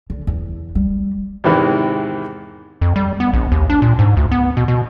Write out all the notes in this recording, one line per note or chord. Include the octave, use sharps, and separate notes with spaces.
D3
E2
G3
E2 G#2 C3 D#3 E3
F2
G3
B3
A#1
D#2
D4
A#2
G#2
D2
B3
B2
B2